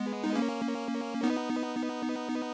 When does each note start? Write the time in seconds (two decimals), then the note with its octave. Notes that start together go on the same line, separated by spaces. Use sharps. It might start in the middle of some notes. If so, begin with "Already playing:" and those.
Already playing: G#3 B3
0.24 D#4
0.35 A#3 C#4
1.23 B3 D#4